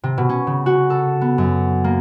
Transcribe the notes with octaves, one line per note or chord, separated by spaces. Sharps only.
C3
B2
C#4
C#3
F#4
A4
B3
F#2
A#3